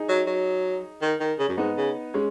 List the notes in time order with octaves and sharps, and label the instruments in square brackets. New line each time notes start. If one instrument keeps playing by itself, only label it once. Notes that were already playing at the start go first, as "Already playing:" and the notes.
Already playing: [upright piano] D#4 G#4
[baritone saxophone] F#3
F#3
D#3
D#3
C#3
F#2
[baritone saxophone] G#2 [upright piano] B3 D#4
[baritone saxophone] C#3
[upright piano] G#3 C#4